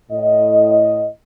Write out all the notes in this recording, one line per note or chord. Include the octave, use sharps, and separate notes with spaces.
A2 D#5